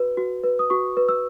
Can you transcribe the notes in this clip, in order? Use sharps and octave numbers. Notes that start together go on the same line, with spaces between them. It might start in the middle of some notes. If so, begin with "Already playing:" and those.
Already playing: F#4 B4
F#4
B4
D#6
F#4 C#6
B4
E6